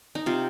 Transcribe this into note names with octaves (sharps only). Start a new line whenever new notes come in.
D#4
C3 F4